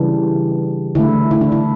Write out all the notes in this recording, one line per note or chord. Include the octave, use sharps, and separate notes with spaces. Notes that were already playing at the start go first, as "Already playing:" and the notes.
Already playing: C#3 E3 G3 D4
D3 A3 E4
E4
D4
E4